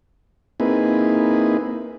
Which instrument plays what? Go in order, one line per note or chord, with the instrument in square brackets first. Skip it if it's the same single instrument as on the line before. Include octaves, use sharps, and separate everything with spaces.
[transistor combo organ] A#3 C4 D#4 E4 G#4 B4